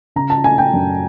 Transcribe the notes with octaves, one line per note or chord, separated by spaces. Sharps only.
C#3 A#5
A5
A3 G#5
G5
F#2